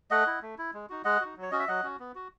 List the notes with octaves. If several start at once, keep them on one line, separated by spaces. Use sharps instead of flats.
A3 D#5 F#5
E4
A3
E4
G#3
D#4 F#4
G#3 D#5 F#5
D#4 F#4
F#3
C#5
C#4 F#4 D#5
E5
F#3 D#5 F#5
C#4 F#4
B3
F#4